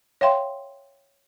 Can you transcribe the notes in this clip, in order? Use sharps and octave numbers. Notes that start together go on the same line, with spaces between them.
C#5 E5 F5 G5 C6